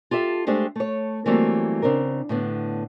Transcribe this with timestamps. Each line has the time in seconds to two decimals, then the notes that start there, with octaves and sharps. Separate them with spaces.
0.11 F4 G4 A4 E5
0.47 G#3 A3 D4 G4 C5
0.76 A3 C#5
1.26 E3 F#3 G3 A3 A#3 C4
1.82 C#3 C4 D4 A#4
2.29 A2 D3 B3